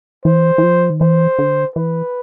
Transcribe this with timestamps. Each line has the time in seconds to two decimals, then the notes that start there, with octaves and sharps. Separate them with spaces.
0.25 E3 C5
0.58 E3
0.63 F3
0.90 D#3
1.01 E3 C5
1.39 D3
1.76 E3 B4